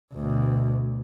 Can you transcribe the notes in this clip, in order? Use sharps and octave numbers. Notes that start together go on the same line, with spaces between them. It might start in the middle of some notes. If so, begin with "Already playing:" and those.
D2 B2